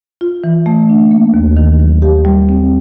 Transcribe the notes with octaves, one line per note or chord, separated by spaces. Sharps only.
F4
E3
A3
D4
A#3
D#2
D#3
F#3
G4
G3
C4